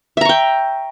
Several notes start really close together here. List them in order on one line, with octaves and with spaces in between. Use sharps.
E5 A#5 C#6 G5